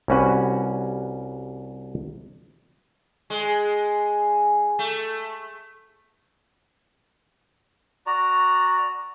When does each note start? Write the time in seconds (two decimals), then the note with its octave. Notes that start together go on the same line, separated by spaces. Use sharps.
0.08 C2 G3 C#4 F#4 B4
3.30 G#3
4.79 A3
8.06 F#4 D5 A#5